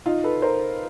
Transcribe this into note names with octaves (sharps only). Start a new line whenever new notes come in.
D#4 F4
A4 B4
A#4 C5